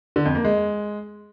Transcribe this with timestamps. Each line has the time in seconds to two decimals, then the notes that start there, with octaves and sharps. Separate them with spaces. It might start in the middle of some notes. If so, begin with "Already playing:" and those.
0.16 D3
0.25 F2
0.35 A#3
0.45 G#3